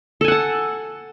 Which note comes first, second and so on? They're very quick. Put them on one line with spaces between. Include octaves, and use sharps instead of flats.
A4 G#5 F#5 A5